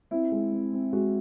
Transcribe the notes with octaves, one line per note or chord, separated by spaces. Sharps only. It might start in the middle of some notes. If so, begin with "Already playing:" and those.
C4 E4
G#3
C4
C4
G#3 F#4